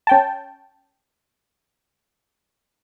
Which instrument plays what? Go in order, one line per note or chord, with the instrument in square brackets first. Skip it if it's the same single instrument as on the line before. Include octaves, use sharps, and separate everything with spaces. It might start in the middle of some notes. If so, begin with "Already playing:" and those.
[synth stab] C#4 G5 A5